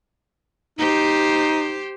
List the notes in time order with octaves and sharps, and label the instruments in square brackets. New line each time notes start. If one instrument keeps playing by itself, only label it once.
[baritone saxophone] D#4 [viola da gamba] G4 C5